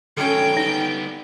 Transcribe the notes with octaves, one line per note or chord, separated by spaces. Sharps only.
D#3 F#3 C#4 A4 G5
G3 B3 D#4